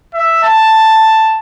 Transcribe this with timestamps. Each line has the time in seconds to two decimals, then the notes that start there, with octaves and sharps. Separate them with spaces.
0.14 E5
0.43 A5